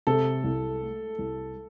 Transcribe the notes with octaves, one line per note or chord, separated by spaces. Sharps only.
C3 A4
C2
A3
C2